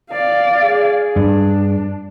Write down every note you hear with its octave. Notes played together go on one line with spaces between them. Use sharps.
D5 F5
G#4
G2 D4